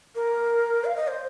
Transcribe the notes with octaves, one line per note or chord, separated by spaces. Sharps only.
A#4
F5
D#5
C5